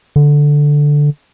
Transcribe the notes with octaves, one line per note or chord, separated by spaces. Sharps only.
D3